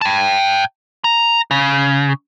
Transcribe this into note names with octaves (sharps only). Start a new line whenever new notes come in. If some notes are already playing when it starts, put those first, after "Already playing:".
G5 A5
A#5
C#3